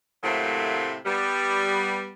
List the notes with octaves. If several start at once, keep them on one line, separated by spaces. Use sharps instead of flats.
A2 C3 F#3 A3 A#3 C4
G3 B3